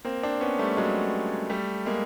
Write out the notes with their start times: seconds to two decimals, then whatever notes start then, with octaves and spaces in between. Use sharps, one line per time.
0.05 A#3 C4
0.23 C4 D4
0.41 B3 C#4
0.59 G3 A3
0.77 F#3 G#3
1.50 G3 A3
1.86 G#3 A#3